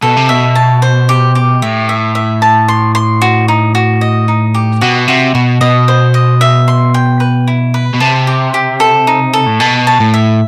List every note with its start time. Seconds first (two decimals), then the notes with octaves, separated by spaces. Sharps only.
0.02 B2 A4
0.16 C3
0.29 B2 E5
0.55 A5
0.82 C5
1.09 G4
1.35 G4
1.62 A2 E5
1.89 E5
2.15 E5
2.42 A5
2.68 C6
2.95 C6
3.22 F#4
3.48 D#4
3.75 F#4
4.01 D#5
4.28 D#4
4.54 G4
4.81 B2 F#4
5.07 C3 F#4
5.35 B2 F#4
5.61 B2 D#5
5.88 C5
6.14 D#5
6.41 E5
6.68 C6
6.94 G5
7.20 B4
7.48 E4
7.74 B4
7.94 B2
8.00 C3 A5
8.27 G4
8.54 G4
8.80 A4
9.07 D#4
9.34 A4
9.46 A2
9.60 B2 A5
9.87 A5
10.00 A2
10.14 E5